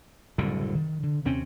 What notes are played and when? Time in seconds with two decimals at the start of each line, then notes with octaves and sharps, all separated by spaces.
0.38 F#1 C2 A2 D3
0.75 D#3
1.03 D3
1.25 D#2 C3 C4 C#4